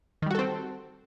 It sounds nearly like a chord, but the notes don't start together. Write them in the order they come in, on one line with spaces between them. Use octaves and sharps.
D#3 G3 F#4 A4 C4